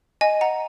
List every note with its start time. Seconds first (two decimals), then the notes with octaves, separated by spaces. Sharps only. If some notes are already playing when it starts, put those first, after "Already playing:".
0.21 D#5 G#5
0.41 F#5 A#5